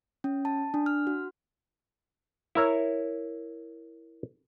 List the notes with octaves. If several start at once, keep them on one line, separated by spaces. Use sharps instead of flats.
C#4
A5
D4
F6
F#4
E4 A#4 C#5